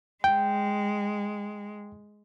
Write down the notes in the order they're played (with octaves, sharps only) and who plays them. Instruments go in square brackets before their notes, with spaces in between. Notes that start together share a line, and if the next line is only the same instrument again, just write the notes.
[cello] G#3 [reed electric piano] G5